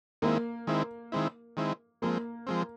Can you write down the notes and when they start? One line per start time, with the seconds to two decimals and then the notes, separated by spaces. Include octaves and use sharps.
0.22 D#3 G#3 A#3 C4 E4
0.67 D#3 G#3 C4 E4
1.12 D#3 G#3 C4 E4
1.57 D#3 G#3 C4 E4
2.02 F3 G#3 A#3 C4
2.47 F3 G#3 C4